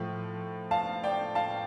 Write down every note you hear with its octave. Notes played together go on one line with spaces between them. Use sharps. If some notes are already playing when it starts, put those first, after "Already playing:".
Already playing: A2 F3
F5 A5
D5 G5
F5 A5